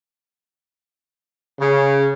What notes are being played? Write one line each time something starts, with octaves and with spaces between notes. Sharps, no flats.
C#3